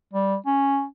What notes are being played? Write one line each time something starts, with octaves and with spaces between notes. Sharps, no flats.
G3
C#4